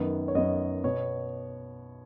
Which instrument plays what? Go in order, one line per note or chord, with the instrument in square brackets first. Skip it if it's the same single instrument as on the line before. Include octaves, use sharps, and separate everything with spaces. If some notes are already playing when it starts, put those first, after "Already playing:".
Already playing: [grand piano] F#2 D#3 B3
C#5
F#2 D#3 B3 D#5
B2 B3 C#5